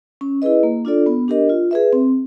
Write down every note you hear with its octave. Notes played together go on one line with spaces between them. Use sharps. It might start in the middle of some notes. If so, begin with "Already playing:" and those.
C#4
E4 G#4 B4 D#5
A#3
D4 F4 A4 D5
B3
D4 G4 A#4 D#5
F4
G#4 B4 E5
C4